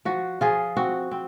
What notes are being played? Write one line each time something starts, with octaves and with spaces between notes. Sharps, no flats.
F3 F#4
F3 F4 G#4
C4 F#4
C4